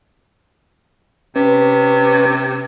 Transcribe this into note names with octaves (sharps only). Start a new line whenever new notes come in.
C3 C#4 B4